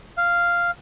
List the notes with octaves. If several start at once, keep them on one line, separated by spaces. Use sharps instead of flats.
F5